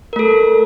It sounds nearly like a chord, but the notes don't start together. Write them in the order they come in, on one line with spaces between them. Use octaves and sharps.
A#4 A3 A4